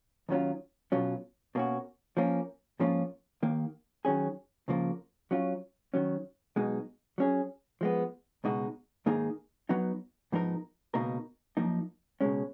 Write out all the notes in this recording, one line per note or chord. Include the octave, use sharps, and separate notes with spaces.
D#2 D#3 F#3 C#4 F4
B1 B2 F#3 C#4 F4
B2 A#3 C#4 F#4
F3 A#3 C#4
G#2 F3 A#3 C#4 F4
D#2 D#3 A#3
D#3 F#3 C#4 G#4
C#2 C#3 F3 A#3
F#3 C#4 F4
D#3 F#3 C#4
B1 B2 G#3 D#4
F#3 C#4 G#4
F3 G#3 B3
C#2 B2 G#3 D#4 F#4
G#2 D#3 A#3 D#4 G#4
F#3 B3 D#4
G#2 F3 B3 D#4 A#4
C#2 B2 A#3 D#4 A#4
F#2 F3 A#3 D#4
C#2 B2 G#3 C#4